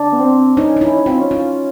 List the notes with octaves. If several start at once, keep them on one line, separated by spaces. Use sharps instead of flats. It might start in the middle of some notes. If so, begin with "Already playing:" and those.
Already playing: D4
B3
C4
C#4 D#4
D#4
E4
C#4
C4 F4
C#4
F4